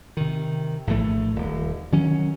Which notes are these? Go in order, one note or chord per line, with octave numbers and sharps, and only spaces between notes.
C3 D#3
A#1 A2 E3 A3
D#1
D#3 F#3 C#4